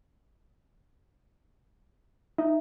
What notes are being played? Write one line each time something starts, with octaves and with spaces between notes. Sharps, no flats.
D#4 E5